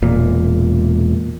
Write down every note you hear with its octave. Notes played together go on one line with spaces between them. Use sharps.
E1 A#2